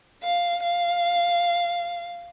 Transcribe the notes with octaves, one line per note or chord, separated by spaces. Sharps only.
F5
F5